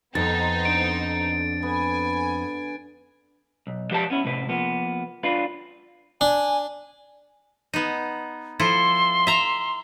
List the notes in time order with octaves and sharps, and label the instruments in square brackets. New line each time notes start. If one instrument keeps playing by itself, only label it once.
[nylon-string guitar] F2 [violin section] B3 D#4 C5 [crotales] A6
[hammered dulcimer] D3 D4 [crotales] D7
[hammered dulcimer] B3 [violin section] G#5
[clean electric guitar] B1
F3 G4 B4 D5 A5
B3 C#4 E4
A2 C3 B4
F3 A#3 B3
D4 F4 B4
[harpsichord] D4 [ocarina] G#5
[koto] B3 D#4
[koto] F3 E4 A4 [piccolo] C6
[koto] E5 A#5